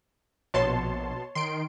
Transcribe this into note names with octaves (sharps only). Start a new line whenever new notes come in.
A#1 B2 C#5 A5 C6
D#3 C6 D7